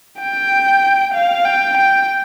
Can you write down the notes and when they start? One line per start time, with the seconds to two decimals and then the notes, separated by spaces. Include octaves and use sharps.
0.20 G5
1.14 F5
1.45 G5
1.77 G5